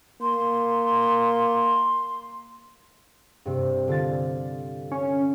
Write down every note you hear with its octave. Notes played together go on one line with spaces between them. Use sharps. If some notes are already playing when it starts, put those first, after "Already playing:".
A#3 C6
G2 C3
D3 F4 A6
C#4 C#7